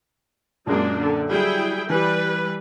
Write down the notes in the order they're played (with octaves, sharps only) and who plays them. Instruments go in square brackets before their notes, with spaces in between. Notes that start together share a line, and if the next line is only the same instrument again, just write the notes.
[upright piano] A#1 F#2 [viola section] G#3 A#3 D4
[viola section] D3
[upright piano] F#3 G3 [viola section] E4 G#4 G5
[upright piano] E3 [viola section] G3 B4